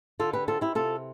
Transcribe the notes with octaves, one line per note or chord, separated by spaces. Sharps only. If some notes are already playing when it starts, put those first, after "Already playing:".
D3 F4 A4
G4 B4
C4 F4 A4
E4 G4
C3 F4 A4